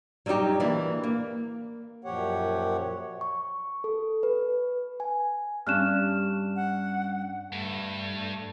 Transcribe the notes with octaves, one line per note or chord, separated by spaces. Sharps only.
F#3 G3 C#4 D#4 G4
E3 A#3 D4
A#3
F#2 A#2 F3 G4 C#5 F#5
C#6
A4
B4
G#5
G2 C#4 D4 F6 F#6 E7
F#5
G2 A3